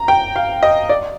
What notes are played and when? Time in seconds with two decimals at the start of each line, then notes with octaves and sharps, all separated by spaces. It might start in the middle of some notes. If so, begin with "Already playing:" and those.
Already playing: A#5
0.08 G5
0.36 F5
0.63 D#5
0.89 D5